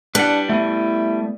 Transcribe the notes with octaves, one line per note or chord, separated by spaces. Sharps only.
G3 D4 B4 F#5
A3 B3 E4